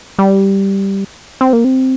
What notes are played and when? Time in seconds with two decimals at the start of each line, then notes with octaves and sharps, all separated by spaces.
0.19 G3
1.41 C4
1.53 A#3
1.64 C4